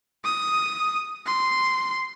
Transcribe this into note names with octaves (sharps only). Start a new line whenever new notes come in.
D#6
C6